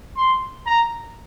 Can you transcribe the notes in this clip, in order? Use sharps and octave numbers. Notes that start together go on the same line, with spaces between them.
C6
A#5